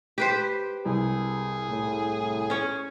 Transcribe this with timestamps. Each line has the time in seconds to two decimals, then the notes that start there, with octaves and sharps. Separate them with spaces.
0.18 G4 B4 C5
0.85 C2 G#4
1.69 A2
2.50 C#4 C#5